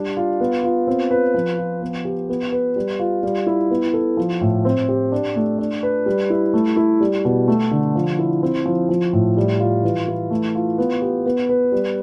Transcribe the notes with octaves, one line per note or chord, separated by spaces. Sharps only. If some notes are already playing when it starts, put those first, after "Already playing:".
Already playing: G3 D4
F4
B3
F4
C4
B4
F3
F4
B3
G4
B3
B4
G3
F4
G3
E4
B3
A4
F3
A2
C4
G4
D4
A3
D4
B4
G3
E4
A3
E4
G3
B2
A3
D3
F3
E4
C4
F3
F3
A2
G3
F4
E3
E4
A3
F4
B3
G4
B3
B4
G3